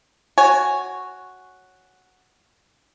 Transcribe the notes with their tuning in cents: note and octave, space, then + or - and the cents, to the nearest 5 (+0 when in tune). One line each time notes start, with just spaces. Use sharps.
F#4 +0 C#5 -5 G#5 +0